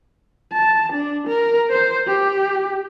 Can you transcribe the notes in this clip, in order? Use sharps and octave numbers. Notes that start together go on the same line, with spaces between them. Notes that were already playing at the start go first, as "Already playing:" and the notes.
A5
D4
A#4
C5
G4